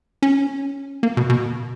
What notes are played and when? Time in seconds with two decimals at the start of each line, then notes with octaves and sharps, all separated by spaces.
0.22 C#4
1.03 A#3
1.17 B2
1.30 B2